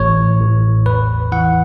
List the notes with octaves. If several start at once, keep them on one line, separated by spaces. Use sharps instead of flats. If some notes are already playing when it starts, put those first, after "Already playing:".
Already playing: A1 A2 E3 C#5
A1
E2 B4
E3 F#5